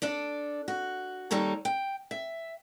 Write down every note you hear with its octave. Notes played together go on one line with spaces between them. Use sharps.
D4 A4 D5
F#4
D#2 G3 A4 C#5 A#5
G5
E5